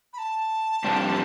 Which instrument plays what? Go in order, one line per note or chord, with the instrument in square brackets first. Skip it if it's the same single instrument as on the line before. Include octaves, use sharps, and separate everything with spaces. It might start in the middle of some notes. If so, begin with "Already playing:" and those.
[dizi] B5
A5
[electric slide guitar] F2 C3 G3 D4